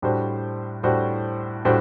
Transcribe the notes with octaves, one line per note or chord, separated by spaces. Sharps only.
A2 G3 D4 F#4 C5
A2 G3 D4 F#4 C5
A2 G3 D4 F#4 C5